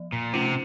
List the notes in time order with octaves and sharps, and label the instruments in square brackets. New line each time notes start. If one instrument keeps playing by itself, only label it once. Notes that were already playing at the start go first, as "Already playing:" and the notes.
Already playing: [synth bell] F3
[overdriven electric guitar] A#2
[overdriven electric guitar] C3 [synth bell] A3 C#4 F4 C5